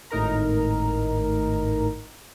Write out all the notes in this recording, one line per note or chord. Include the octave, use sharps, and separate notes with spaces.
G#1 A2 D#4 A#4 A#5